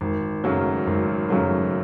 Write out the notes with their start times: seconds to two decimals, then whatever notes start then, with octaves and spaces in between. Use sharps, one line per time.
0.01 G#1
0.43 F#2 C#3 F#3 A3
0.87 G#1
1.29 F#2 C#3 F#3 A3